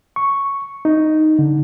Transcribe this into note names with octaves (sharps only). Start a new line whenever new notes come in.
C#6
D#4
D3